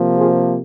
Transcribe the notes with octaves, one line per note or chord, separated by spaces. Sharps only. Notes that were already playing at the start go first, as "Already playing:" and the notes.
Already playing: C3 F3 A#3
F4 G#4